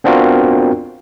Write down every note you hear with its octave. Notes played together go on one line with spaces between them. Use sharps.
B3 C4 D4 F4 F#4 A#4